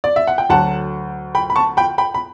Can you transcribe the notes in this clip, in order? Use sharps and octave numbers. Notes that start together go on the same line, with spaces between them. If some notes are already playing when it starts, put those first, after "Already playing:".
D5
E5
F#5
G5
D2 D3 F#3 F#5 A5
G5 B5
B5
A5 C#6
G5 B5
G5 B5
B5